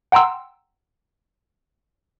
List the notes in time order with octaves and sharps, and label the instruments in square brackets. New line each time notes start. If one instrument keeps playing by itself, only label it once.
[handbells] F#5 G5 A#5 C6 E6